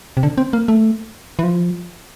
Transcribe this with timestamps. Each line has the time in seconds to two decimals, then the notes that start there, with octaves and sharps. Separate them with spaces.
0.17 C3
0.23 D3
0.38 C4
0.53 A#3
0.68 A3
1.39 E3
1.43 F3